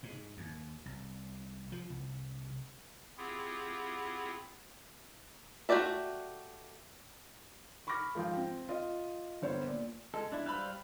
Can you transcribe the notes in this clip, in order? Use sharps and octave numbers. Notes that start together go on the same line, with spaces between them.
G#2
D#2
C2
F3
C2
C4 E4 F4 G4 G#4 F#5
A3 F#4 G4 D5 E5
B5 C#6 D6 F6 A#6
G#2 F3 F4 F5 G5
C4
F4 D#5
G1 B3 C5 C#5
A#2
G#3 A4
D4 E4
G3 C5 F5 B5 E6 F#6